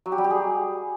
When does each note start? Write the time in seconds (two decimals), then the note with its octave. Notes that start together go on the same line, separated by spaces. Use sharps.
0.06 F#3
0.12 G4
0.18 G3
0.24 G4
0.31 G#4